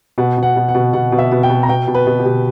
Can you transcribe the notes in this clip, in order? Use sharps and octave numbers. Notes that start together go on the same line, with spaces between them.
B2 F#5
B2
F#5
B2
F#5
B2
B2 F#5
B2
E5
B2
G5
B2
A#5
B2 G5
B2
B4
B2
G4
B2